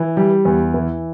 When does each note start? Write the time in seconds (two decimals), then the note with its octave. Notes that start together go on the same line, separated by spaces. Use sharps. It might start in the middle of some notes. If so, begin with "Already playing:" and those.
Already playing: E3
0.17 G3
0.45 E2
0.74 E3